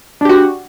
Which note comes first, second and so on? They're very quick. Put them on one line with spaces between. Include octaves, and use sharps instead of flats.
D4 G4 F#4